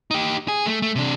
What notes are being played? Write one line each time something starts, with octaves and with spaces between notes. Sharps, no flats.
D#4 G4
G#4
A3
A3
C3 D4